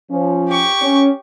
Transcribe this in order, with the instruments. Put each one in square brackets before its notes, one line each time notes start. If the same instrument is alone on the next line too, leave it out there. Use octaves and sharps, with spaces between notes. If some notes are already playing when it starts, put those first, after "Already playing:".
[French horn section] F3 C#4
[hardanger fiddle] G4 C#6
[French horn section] C#4